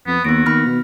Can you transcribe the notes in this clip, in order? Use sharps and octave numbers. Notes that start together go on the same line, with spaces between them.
F2 B3
D#2 B3 F#4 D7
D#3 B5 F6
B2